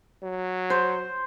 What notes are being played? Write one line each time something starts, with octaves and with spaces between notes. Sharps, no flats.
F#3
C5